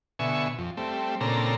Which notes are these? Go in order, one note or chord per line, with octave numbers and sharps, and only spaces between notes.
B2 D3 E5 G#5 C#6
F2
G3 A3 C4
A#2 C#3 C4 D4 A4 A#5